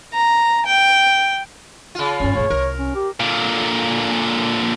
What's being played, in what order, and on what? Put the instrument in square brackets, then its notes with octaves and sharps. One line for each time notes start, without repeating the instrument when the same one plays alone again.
[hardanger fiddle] A#5
G5
[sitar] C#3 F4
[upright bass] A1 G2 [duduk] C#4
[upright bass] F#1 A2 [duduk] C#5
[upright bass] C2 [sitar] A#4
[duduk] C#4
G4
[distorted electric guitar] A#2 D3